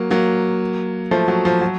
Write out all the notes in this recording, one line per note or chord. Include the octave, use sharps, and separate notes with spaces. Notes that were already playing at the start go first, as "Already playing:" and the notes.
Already playing: F#3 A#3
F#3 A#3
F3 A3
F#3
F3
F#3